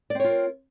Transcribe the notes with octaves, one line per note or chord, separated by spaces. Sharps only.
C4 F4 A#4 C#5 D5